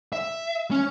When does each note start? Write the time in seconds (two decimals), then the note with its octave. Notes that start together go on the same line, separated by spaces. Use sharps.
0.13 E5
0.71 C#4